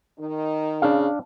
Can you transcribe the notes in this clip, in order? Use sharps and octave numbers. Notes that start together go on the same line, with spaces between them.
D#3 D#4
C#3 D4 F5